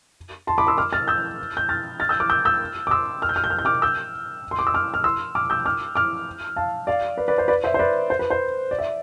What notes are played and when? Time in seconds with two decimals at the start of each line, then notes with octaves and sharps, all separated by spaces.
0.47 A5 C6
0.58 B5 D6
0.67 C6 E6
0.78 D6 F6
0.93 F6 A6
1.08 E6 G6
1.57 G6
1.69 F6 A6
2.00 F6 A6
2.09 E6 G6
2.20 D6 F6
2.30 E6 G6
2.45 E6 G6
2.87 D6
2.91 C6 E6
3.22 F6
3.29 G6
3.36 F6
3.44 G6
3.50 F6
3.59 G6
3.65 D6 F6
3.82 E6 G6
4.51 C6
4.59 D6
4.67 E6
4.74 D6 F6
4.94 F6
5.04 C6 E6
5.35 D6 F6
5.50 E6 G6
5.65 D6 F6
5.95 D6 F6
6.56 F5 A5
6.87 D5 F5
7.17 B4 D5
7.28 B4 D5
7.38 C5
7.48 B4 D5
7.64 C5 E5
7.74 C5
7.79 B4 D5
8.10 C5
8.19 B4
8.30 C5
8.71 D5
8.79 E5